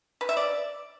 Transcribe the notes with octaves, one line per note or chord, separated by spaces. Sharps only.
B4
E5
D5